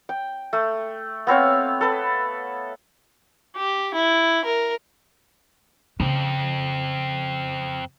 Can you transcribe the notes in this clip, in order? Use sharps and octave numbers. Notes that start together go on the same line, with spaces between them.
G5
A3
B3 C4 C#5 F5
A4 B4
G4
E4
A#4
F2 C#3 C4